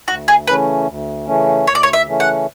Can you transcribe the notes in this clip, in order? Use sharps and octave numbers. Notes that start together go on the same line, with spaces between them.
D2 F#4
G#4
C#3 E3 A3 C#4 B4
D2
C#3 E3 A3 C#4
D2 C#5
D5
C#5
E5
C#3 E3 A3 C#4
F#5